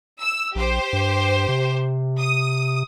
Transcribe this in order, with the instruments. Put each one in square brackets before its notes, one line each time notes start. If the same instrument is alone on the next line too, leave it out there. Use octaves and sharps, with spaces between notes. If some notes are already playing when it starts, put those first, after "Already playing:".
[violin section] E6
[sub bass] A#1 [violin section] G4 C5
[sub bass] G2
C3
[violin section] D#6